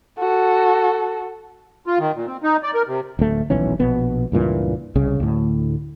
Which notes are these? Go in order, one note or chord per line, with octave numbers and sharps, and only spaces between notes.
F#4 A4
F4
D#3
A#2
C4
D#4
D5
A#4
C3
D1 D2 A3
D#1 B1 E3 C#4
A#1 B2 B3
C#2 G2 A#2 E3
C2 C#3
D2 A2